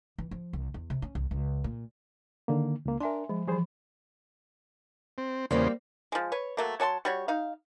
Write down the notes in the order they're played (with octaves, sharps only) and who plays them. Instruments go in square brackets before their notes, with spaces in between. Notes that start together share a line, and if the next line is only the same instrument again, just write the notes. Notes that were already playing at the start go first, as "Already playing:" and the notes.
[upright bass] E3
F3
C2
E2
C3
C#4
C2
C#2
A#2
[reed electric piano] D3 D#3 A#3
C#2 A#3
[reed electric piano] D4 A#4 [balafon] E5 G#5 C6
[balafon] F3 [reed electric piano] G#3
[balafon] E3 F3 [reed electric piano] G3 G#4 C5
[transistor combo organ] C4
[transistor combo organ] E2 C#3 C5 [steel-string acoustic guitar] G3 A#3 C4
[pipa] F3 G#3
B4 C#5
F#3 A3 A#3
F#3 C#5 A5 C6
G3 F#4 C#5
D#4 F5